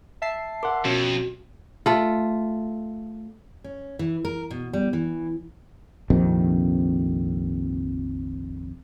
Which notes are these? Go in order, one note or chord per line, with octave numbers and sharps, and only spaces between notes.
E5 A5 C7
A#4 F#5 C6 D6
F2 B2 C#4 F#4
A3 F4
C#4
E3
A#4
B2
G3
E3
A#1 F2 C3 D#3